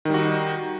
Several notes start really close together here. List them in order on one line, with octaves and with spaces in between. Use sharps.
D#3 G3 F#4 D#4